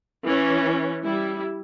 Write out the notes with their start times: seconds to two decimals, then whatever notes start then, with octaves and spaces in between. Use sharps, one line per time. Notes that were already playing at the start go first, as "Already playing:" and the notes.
0.24 E3 C#4
1.02 G3 E4